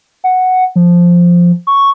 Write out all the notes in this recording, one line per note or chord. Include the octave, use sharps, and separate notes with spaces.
F#5
F3
C#6